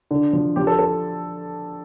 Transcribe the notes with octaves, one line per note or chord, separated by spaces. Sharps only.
D3
F3
F3 G4
A4
A4